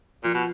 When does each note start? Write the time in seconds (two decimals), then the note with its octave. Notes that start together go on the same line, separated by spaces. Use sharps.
0.24 A#2 F3
0.34 B2